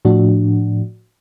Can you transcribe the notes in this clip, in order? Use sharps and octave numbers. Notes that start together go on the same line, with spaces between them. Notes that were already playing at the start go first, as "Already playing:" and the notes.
A2 F3 D4 F#4